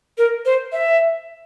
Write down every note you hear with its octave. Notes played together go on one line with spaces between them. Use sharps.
A#4
C5
E5